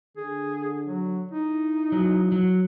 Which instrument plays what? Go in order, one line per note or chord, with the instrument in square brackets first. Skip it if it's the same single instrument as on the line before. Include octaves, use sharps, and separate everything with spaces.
[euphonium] D3 [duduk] G#4
[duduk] F#3
[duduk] D#4 [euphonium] E4
[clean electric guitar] F#3
F#3